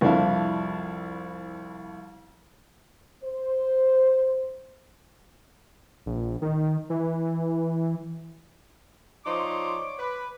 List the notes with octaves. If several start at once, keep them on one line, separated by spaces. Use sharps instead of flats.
C2 F2 D4 E4 F5
C5
A#1
D#3
E3
F3 D#4 C#5 D5 C6 D6
B4